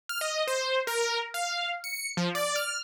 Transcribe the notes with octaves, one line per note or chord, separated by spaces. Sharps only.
F6
D#5
C5
A#4
F5
C#7
F3
D5
F6